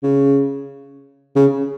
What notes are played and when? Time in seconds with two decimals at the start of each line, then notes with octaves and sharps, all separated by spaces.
0.03 C#3
1.36 C#3